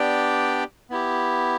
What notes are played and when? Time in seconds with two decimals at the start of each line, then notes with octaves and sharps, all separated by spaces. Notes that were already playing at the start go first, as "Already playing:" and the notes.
Already playing: B3 D4 G4 D5 G5
0.90 B3 E4 G4